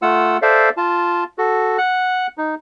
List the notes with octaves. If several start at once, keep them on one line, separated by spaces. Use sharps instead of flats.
A3 F4 F#5 E6
A4 C5 D5 E5 F5
F4 A5
F#4 A4
F#5 F#6
D#4